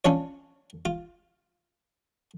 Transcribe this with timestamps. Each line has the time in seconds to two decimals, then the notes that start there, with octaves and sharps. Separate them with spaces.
0.05 C#4 D4 F4 C#5
0.85 F4